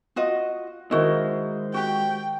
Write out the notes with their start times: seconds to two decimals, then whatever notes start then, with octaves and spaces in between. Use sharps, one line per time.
0.16 F4 F#4 D#5
0.91 D#3 G#3 E4 F#4 A#4 C5 D#5
1.74 F#4 G4 G5